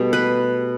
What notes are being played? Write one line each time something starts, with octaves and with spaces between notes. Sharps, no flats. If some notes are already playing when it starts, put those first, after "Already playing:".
Already playing: B2 G3 A3 B3
B4